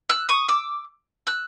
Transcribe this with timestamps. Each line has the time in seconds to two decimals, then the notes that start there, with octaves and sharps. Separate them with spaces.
0.09 E6 F#6
0.29 C#6 D#6
0.48 D6 E6
1.27 E6 F#6